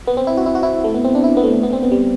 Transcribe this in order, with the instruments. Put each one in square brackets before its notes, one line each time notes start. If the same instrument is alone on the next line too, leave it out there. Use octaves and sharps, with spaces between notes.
[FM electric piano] B3
C4
E4
F#4
E4
F#4
E4
A3
B3
C4
D4
E4
B3
A3
B3
C4
B3
G3